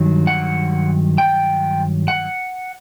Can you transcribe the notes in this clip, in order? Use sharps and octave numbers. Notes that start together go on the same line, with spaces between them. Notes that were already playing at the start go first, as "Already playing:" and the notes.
Already playing: G2 D#3 F#3
F#5
G5
F#5